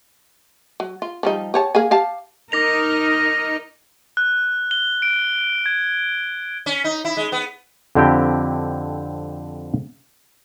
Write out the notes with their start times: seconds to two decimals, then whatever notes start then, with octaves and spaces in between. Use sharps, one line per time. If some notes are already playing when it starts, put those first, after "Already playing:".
0.80 F#3
1.02 F4
1.23 F3 G3 D#4
1.54 G4 C#5 A5
1.75 A#3 G#4 G#5
1.91 G4 F5 A5
2.52 D#4 A#4 D#5 D6 A#6 F7
4.17 F#6
4.71 G7
5.02 D7
5.66 G#6
6.66 C#4
6.84 D#4
7.05 E4
7.17 G#3
7.32 B3
7.95 F2 D3 C4 E4 G4 G5